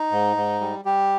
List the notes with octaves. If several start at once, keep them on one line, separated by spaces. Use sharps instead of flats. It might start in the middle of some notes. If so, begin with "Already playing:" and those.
Already playing: D#4
G#2
G#2
G3
G3 G4